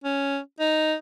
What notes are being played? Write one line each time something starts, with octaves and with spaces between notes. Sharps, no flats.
C#4
D#4